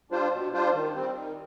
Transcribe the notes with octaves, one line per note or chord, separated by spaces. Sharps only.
G3 D4 F4 C5
B2
G3 D4 F4 C5
D#3
G3 C4
D#3